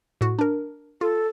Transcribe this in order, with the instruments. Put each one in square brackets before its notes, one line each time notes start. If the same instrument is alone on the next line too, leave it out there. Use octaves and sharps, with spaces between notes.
[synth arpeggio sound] A2 F#4
D4 A#4
[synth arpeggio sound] F4 [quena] A4